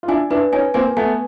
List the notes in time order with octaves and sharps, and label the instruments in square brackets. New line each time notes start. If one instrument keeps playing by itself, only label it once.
[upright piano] F4
[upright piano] D4 E4 [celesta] G#5
[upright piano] D4 E4 [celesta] B4
[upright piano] C#4 D#4 [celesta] G#5
[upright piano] A#3 C4 [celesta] G#5
[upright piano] A3 B3 [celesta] G#5